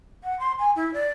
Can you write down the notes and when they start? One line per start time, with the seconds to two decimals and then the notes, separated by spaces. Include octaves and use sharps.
0.24 F#5
0.40 C6
0.59 G#5
0.76 E4
0.94 D5